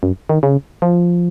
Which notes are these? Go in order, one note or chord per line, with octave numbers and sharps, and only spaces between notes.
F#2
D#3
C#3
F3